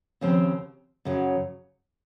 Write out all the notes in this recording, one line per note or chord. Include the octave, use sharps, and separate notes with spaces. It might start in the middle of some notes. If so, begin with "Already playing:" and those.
D#2 C#3 F3 C4
F#2 C#3 F#3